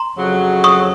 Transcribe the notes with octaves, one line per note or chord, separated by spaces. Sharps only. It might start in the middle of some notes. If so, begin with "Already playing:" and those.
Already playing: A#5 C6
F2 C#3 F#3
C#6 D#6